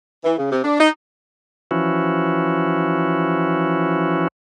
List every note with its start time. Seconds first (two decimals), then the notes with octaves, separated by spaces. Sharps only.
0.24 E3
0.38 C#3
0.51 C3
0.64 D4
0.79 D#4
1.71 E3 F3 C#4 E4 F#4